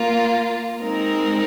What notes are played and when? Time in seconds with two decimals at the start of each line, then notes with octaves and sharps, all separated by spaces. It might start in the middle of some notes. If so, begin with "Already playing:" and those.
Already playing: A#3 F4 A#4
0.81 G#3 C4 D#4 A#4